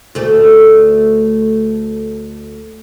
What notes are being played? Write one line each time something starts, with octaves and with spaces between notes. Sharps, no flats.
D2 A3